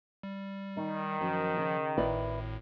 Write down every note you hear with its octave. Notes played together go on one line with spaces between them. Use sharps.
G3
D#3 D#4
F#2 F3
C#3
G#1 A2 E4 B4 D5